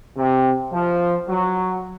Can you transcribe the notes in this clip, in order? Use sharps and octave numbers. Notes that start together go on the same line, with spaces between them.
C3
F3
F#3